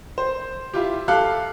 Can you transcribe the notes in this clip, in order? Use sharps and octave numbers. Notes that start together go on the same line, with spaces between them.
C5
E4 F4 G4
G4 A4 F5 F#6